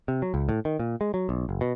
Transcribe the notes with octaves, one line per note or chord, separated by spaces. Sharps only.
C3
F#3
C#2
A2
D#3
A#2
G#3
F#3
B1
F#1
B2